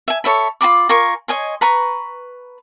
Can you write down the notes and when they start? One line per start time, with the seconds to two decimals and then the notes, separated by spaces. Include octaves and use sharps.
0.08 E5 G#5
0.24 A4 C#5 E5 B5
0.61 F4 F#4 B5 D6
0.89 F4 A#4 G#5 C#6
1.28 C#5 D#5 G#5 C6
1.61 B4 A#5 B5 C#6